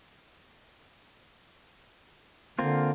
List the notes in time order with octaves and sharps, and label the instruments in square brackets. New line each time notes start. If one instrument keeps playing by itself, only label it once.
[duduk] D3 [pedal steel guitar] A#3 C4 F4